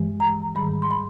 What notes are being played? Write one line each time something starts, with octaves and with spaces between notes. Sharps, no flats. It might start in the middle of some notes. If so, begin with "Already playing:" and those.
Already playing: G2 E3 G#3
A#5
G#2 D#3 G3 B5
C6
B5